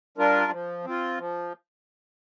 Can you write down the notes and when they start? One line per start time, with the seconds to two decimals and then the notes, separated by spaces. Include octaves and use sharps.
0.17 G3 D4 F4 A#4
0.52 F3
0.84 C4 F4
1.19 F3